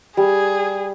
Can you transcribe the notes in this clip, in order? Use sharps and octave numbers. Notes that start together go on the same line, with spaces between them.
G3 G#4